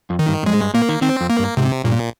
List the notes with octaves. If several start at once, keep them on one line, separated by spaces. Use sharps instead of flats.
F2
D#3
G2
G2
F2 G#3
G#2
G2
A#2 A#3
D#3
D#3 C4
F2
A#3
G2
G#2 C3
G2 A#2